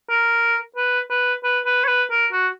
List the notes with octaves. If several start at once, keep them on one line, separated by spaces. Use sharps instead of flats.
A#4
B4
B4
B4
B4
C#5
B4
A#4
F#4